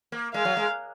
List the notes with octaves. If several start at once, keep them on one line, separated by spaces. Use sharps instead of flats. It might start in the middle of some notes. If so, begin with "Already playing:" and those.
A#3
G#3 F5
F#3
G#3